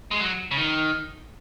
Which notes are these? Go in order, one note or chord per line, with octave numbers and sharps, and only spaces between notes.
G#3
F#3
C#3
D#3